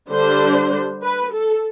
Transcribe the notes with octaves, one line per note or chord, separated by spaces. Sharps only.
D3 G3 D4 C5
B4
A4